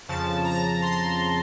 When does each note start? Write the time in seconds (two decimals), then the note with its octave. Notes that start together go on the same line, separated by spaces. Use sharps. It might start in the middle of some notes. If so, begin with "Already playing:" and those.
0.08 F2 C#3 F3 A5
0.45 A#5
0.82 C6